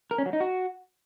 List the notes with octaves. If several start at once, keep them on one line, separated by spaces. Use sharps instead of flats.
A#4
C#4
F#3
D#4
F#4